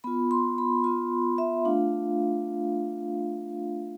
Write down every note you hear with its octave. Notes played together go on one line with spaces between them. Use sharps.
B3 F4 B5
C6
B5
B3 F4 C6
E5
A3 D4 F4 F5